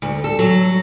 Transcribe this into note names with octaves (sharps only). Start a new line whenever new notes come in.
D2
A4
F#3